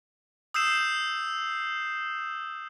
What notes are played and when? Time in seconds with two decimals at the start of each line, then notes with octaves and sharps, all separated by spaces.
0.54 D#6 E6 G6 C7 E7